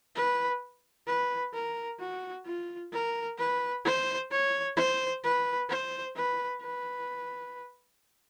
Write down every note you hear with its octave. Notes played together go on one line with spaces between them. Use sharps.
B4
B4
A#4
F#4
F4
A#4
B4
C5
C#5
C5
B4
C5
B4
B4